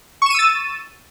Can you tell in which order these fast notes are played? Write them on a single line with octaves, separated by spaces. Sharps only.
C#6 E7 D#7 E6 A6